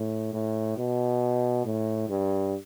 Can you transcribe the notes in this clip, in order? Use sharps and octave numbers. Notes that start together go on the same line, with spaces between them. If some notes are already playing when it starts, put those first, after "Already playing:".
Already playing: A2
A2
B2
A2
G2